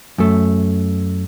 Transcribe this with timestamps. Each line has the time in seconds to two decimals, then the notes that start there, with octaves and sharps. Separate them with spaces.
0.18 F#2 A3